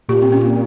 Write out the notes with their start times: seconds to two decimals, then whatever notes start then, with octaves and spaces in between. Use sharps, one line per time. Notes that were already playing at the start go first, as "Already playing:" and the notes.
0.09 A#2 G4
0.22 C4
0.32 C#4